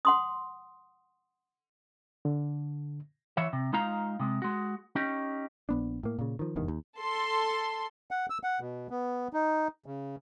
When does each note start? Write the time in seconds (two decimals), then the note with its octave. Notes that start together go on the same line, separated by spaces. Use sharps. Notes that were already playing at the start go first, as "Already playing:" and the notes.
0.05 F#5 C6 D#6
2.25 D3
3.37 E3 C#5 E5
3.53 C3
3.73 G#3 D#4 F4 F5 A#5
4.20 C3 G#3
4.42 G#3 F#4
4.95 C#4 D#4 G4
5.69 A#1 B3 D4
6.03 A2 A#3
6.19 A#2 C#3
6.39 D#3 F3
6.56 F1 E2 G2 D#3
6.68 D#2
7.00 A4 C6
8.11 F#5
8.30 E6
8.43 F#5
8.60 B2
8.90 B3
9.33 D#4
9.86 C#3